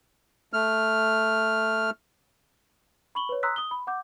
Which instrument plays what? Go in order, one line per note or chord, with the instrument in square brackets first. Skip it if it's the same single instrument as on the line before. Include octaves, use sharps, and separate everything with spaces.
[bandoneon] A3 F6
[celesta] B5 C#6 F#7 G7
B4 C#5
A#5 C6 D#6 E6 F#6 B6
D#6 G7
B5
F#5 D6 G6